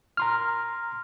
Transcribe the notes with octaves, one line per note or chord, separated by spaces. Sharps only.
A#5 C6 F6